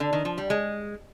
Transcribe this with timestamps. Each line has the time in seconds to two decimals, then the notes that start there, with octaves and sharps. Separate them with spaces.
0.00 D3
0.13 D#3
0.25 F3
0.38 G3
0.50 G#3